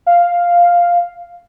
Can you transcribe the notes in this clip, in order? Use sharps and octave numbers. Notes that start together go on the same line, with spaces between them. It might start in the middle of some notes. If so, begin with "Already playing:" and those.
F5